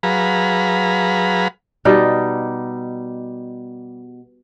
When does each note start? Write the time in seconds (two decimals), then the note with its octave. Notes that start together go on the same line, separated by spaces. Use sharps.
0.03 F#3 G#4 B4 F5 A#5 B5
1.85 B2 G3 D#4